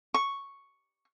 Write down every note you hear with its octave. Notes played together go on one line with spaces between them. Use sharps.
C#6